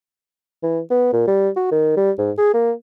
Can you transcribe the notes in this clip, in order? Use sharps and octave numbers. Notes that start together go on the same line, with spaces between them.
E3
B3
A#2
G3
F#4
D#3
G3
G#2
G#4
A#3